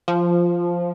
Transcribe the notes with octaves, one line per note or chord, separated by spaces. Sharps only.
F3